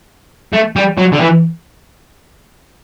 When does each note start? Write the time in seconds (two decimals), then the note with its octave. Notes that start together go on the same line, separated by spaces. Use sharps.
0.53 A3
0.76 G3
0.98 F#3
1.12 D3
1.20 E3